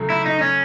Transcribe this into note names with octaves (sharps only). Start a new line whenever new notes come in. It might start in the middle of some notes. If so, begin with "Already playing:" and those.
Already playing: C#3 F#3 A3
E4
D#4
C#4